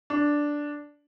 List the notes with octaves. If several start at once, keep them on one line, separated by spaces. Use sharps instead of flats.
D4